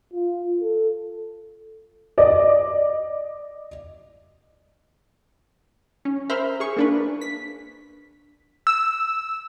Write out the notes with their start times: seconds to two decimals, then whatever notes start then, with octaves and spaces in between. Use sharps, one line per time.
0.13 F4
0.61 A4
2.18 D5 D#5
6.05 C#4
6.30 A#4 C5 E5 B5 F6
6.60 G#4 C#6
6.76 A#3 D4 B4
7.21 B6
8.67 E6